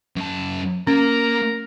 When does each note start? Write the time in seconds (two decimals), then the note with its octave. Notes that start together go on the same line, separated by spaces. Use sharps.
0.16 F#2 A5
0.87 A#3 C#4 A#4